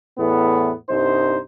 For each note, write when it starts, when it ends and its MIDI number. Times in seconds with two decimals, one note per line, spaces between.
0.19 0.72 40
0.19 0.72 45
0.19 0.72 59
0.90 1.38 36
0.90 1.38 43
0.90 1.38 63
0.90 1.38 72